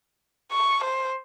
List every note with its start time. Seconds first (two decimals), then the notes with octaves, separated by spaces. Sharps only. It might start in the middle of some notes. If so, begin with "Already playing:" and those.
0.52 C#6
0.85 C5